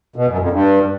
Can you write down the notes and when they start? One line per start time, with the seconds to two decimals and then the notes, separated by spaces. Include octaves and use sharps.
0.16 B2
0.28 F#2
0.39 F2
0.51 G2